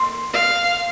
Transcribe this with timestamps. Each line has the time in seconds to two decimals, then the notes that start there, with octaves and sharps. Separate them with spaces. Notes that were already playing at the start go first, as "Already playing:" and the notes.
Already playing: C6
0.34 F5